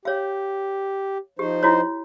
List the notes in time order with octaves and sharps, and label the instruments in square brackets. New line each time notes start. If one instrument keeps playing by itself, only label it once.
[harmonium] G4 [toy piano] C#5 F5
[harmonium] F3 D#4 C5 [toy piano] G4
[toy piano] E4 F#4 C#5